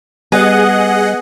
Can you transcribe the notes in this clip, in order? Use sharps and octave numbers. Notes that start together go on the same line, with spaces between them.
G3 B3 G#4 D#5 F#5